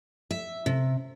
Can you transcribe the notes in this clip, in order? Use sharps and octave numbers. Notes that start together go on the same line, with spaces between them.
E5
C3